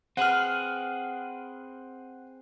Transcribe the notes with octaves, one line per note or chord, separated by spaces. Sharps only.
C4 G#4 B4 F#5 F6